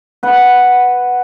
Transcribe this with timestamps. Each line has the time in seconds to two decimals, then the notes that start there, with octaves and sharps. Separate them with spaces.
0.23 B4 F#5